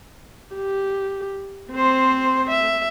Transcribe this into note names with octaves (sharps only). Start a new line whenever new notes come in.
G4
C4 C5
E5